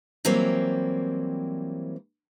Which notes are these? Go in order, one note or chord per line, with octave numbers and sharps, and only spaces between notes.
E3 F#3 G3 A#3 C4